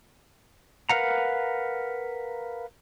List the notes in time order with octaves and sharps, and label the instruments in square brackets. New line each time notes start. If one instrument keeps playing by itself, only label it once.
[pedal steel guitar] A#4 B4 F5 F#5 A#5